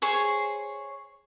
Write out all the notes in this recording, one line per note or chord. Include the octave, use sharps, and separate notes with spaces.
G#4 C5 C#5 C#6